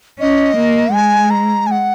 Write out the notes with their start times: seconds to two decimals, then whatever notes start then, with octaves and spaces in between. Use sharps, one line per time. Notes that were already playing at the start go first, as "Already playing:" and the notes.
0.20 C#4 D#5
0.57 A#3
0.93 G#3 G#5
1.30 A#5
1.67 G#5
1.71 F#5